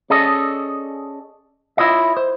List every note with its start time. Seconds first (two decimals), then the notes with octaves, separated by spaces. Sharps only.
0.10 C#4 G#4 A4 D5 D#5
1.77 E4 F4 C#5 D#5 E5
2.17 C5